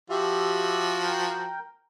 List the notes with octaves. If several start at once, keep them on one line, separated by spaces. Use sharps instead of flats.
F3 F#4 G4 E5
A#4 G5